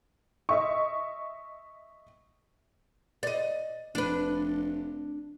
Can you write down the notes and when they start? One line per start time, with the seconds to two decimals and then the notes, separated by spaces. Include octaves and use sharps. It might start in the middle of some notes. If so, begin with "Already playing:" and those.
0.49 D#5 E5 C#6
3.23 D5 D#5
3.95 F1 D4 B4